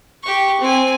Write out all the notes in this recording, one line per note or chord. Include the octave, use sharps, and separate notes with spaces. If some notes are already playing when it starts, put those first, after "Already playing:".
G4 C#6
C4 G#5